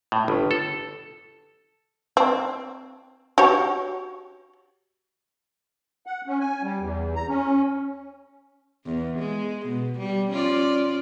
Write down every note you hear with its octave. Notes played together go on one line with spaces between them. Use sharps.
A2
G1
A4
C4
F#4 G4 C#5
F#5
C#4
G#5
G3
E2
A#5
C#4
E2
G#3
B2
G3
C#4 F4 D5